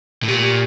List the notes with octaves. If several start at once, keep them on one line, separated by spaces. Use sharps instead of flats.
A2
A#2 G4
G4